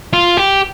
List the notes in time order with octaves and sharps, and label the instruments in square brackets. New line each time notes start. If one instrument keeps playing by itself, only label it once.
[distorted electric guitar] F4
G4